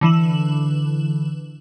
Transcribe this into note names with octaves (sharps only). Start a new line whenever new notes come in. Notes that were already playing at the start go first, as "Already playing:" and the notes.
D3 E3 E7 F#7